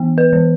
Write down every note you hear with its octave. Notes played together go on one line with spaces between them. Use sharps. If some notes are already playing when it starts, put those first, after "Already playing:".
Already playing: E3 B3
B4
E3